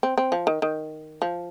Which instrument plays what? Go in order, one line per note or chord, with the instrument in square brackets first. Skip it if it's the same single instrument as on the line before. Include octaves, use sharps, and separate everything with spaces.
[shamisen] C4
C4
F3
D#3
D#3
F3